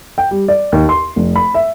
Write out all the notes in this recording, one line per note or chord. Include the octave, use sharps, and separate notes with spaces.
G5
G3
D5
D#2
C6
F1
B5
E5